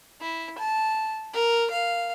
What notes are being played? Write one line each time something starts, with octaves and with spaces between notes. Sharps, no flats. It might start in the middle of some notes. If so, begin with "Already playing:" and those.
E4
A5
A#4
F5